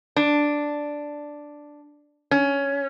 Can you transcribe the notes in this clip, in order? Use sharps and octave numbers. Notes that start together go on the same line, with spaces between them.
D4
C#4